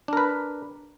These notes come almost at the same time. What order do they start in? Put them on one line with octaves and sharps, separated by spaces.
D4 A#4 B4